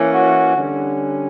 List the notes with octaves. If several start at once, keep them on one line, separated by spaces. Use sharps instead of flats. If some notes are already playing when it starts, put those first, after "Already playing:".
Already playing: E3 A#3 C#4
F#4
D3 G3 C#4